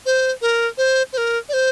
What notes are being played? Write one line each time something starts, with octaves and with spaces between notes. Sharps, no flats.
C5
A#4
C5
C5
A#4
D5
C5